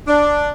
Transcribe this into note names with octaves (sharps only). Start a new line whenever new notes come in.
D4